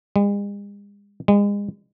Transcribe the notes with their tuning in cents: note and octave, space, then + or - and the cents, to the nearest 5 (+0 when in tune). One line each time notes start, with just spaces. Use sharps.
G#3 -45
G#3 -35